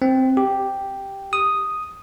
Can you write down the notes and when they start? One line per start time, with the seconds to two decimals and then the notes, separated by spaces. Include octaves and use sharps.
0.02 C4
0.37 G4
1.33 D#6